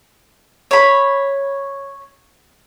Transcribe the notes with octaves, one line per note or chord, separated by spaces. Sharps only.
C#5 B5